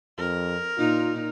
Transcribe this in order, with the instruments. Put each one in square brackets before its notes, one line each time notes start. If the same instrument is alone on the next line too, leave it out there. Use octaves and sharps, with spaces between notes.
[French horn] F2 [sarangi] A#4
[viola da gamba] A#2 D#4 [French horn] F4